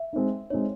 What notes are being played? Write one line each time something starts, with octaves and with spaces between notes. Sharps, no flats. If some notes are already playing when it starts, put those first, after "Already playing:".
Already playing: E5
G#3 C4 D#4
G#3 C4 D#4 C#5